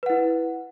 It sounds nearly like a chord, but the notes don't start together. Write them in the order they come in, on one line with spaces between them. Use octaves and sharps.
B4 F#5 E4